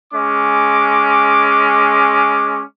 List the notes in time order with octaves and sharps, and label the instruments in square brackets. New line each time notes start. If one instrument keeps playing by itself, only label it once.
[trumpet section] G#3 C#4 D6